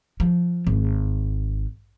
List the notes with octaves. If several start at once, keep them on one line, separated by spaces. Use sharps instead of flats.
F3
G#1